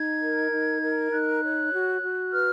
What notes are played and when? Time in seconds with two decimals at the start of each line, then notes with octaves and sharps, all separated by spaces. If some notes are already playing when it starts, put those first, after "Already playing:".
Already playing: D#4 G#6
0.20 A#4
0.50 D#4
0.81 A#4
1.11 D#4 F#6
1.42 C#5
1.71 F#4
2.02 F#4
2.32 B4 F6